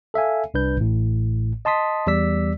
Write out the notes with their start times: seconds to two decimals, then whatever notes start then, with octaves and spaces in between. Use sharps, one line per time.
0.14 A4 E5 F5 G#5
0.54 C2 D4 B4 G6
0.77 A1 A2
1.65 D#5 A5 C6 D#6 B6
2.07 E2 G3 D5 E6 B6